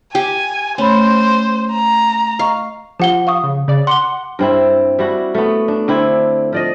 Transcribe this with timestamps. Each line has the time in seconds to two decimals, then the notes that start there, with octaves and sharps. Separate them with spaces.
0.15 G4 G#5
0.78 A3 C#4 C5 B5
1.73 A#5
2.39 D#5 F5 A#5 C#6
3.00 F3 G4 F#5 G7
3.27 F5 C#6 D#6
3.44 C#3
3.68 C#3 D5
3.87 F#5 C6 D6 G7
4.39 G2 C4 E4
4.99 G3 D4 E4 F#4
5.35 A3 B3
5.68 D4
5.88 D3 C4 E4
6.53 F3 D5 D#5